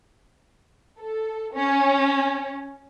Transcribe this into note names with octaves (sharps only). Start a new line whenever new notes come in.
A4
C#4